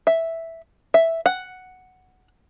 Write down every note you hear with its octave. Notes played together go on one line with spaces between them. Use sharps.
E5
E5
F#5